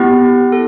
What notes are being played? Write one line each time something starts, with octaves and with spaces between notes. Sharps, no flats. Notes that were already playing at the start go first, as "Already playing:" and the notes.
Already playing: B3 E4 G4
A4